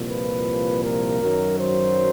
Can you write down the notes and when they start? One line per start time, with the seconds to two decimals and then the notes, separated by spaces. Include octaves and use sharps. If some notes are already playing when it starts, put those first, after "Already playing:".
Already playing: C2 A#2 F3
0.08 B4
0.83 A#4
1.22 F#2 D#3 F#3
1.59 C5